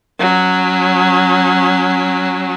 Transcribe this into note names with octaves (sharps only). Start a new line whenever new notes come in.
F#3 C#4